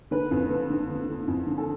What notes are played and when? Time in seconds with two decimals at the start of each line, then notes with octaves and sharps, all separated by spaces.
0.11 D3 B4
0.31 F2
0.50 D3
0.70 D3
0.89 D3
1.08 D3
1.28 F2
1.47 D3
1.58 A4